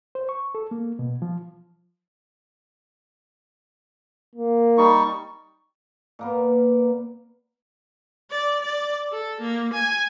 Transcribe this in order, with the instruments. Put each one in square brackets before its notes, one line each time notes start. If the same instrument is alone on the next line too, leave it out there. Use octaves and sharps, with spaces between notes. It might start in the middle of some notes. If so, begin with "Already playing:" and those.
[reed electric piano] C5
C#6
A4
A#3
B2
F3
[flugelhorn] A#3
[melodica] G3 D#4 C#6
[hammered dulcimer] A#2 A#3 B3
[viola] D5
D5
A4
A#3
G#5